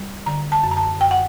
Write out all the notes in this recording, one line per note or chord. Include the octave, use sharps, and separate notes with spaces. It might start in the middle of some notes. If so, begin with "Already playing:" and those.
Already playing: G3
D3 A#5
A5
F#2
A#5
A5
F#2 G5
F#5